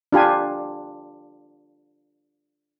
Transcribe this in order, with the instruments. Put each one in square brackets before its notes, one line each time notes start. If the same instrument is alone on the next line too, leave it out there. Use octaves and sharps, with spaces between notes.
[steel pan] D4 F4 G4 G#5